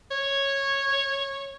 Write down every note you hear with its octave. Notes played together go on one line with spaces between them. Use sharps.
C#5